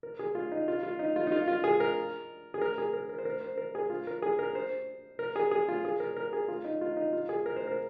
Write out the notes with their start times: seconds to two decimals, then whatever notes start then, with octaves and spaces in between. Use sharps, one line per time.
0.03 A#4
0.19 G#4
0.35 F4
0.52 D#4
0.68 F4
0.83 F4
0.99 D#4
1.16 F4
1.27 D#4
1.32 F4
1.48 F4
1.64 G#4
1.80 A#4
2.54 G#4
2.61 A#4
2.78 G#4
2.93 A#4
3.09 A#4
3.18 C5
3.25 A#4
3.41 C5
3.57 A#4
3.75 G#4
3.90 F4
4.07 A#4
4.22 G#4
4.39 A#4
4.55 C5
5.19 A#4
5.36 G#4
5.51 G#4
5.68 F4
5.85 G#4
6.00 A#4
6.17 A#4
6.33 G#4
6.48 F4
6.64 D#4
6.81 F4
6.97 D#4
7.13 F4
7.29 G#4
7.46 A#4
7.56 C5
7.67 A#4